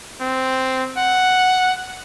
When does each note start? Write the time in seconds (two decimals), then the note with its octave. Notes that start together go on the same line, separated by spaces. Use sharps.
0.20 C4
0.97 F#5